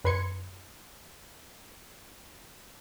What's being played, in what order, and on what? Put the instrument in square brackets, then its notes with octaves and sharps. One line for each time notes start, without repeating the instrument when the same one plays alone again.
[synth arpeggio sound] F#2 B4 B5 C6 G#6 C#7